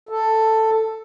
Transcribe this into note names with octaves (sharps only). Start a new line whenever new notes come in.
A4